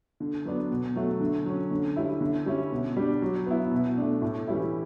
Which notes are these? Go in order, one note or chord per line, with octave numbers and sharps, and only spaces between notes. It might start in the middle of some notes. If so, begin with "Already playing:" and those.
D3
F#3 B3 D4
B2
F#3 A3
D3
F#3 C#4
D3
G3 C#4 E4
D3
G3 C#4 E4
B2
G3 D4
F#3
B3 E4
B2
A3 D4
A2
E3 G3 C#4 E4